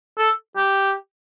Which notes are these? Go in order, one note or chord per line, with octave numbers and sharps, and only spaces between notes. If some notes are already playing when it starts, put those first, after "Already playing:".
A4
G4